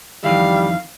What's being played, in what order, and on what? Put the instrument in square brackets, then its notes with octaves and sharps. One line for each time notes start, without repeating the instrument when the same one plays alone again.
[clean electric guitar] F2 D#3 E3 [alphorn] G3 [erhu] F5